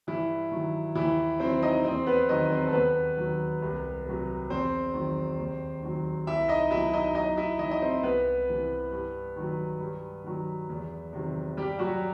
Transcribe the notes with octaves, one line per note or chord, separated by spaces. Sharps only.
G2 E3 E4
D#3 F#3
D#2 E3 E4
D#3 F#3 C4 C5
D#4 D#5
E2 C4 C5
B3 B4
D#3 F#3 D#4 D#5
C4 C5
A4
D#2 B3 B4
D#3 F#3
C2
C3 F#3
E2 C4 C5
D#3 F#3
D#2
D#3 F#3
C2 E4 E5
D#4 D#5
B2 F#3 E4 E5
D#4 D#5
F#2 D#4 D#5
E4 E5
E3 D#4 D#5
D#5
C4 C5
C2 B3 B4
C3 E3
G2
D#3 F#3
G2
D#3 F#3
E2
C3 D#3 F#3
G2 G3 G4
F#3 F#4